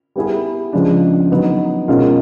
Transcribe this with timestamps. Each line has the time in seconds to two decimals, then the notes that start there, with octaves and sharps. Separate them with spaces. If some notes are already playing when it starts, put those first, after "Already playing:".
0.16 G3 B3 E4 G#4 B4
0.73 C#3 F3 G#3 B3 D4
1.30 F#3 B3 D#4
1.88 B2 G#3 C#4 F4 A#4